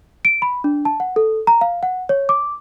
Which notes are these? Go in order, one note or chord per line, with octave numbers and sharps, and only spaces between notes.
D7
B5
D4
A5
F#5
A4
A#5
F5
F#5
C#5
D6